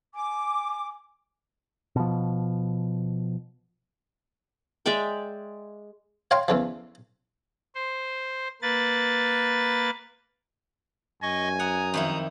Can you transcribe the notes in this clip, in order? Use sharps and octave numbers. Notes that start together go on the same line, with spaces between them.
G#5 D6
B2 F3
G#3 D5 E5 G5
C#5 F5 G5 A#5 C6
E2 C#3 F3
C5
A#3 B4 A6
F#2 D#5 G#5 C#6
F#5 A#5 D#6
F2 D#3 E4